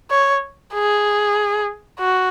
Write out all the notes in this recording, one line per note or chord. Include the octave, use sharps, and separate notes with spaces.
C#5
G#4
F#4